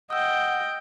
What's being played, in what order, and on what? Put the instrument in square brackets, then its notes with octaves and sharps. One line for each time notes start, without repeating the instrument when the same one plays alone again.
[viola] D#5 G5 [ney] F#5 [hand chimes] D#6 E6